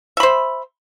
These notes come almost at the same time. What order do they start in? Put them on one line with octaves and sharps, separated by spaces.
E5 B5 C5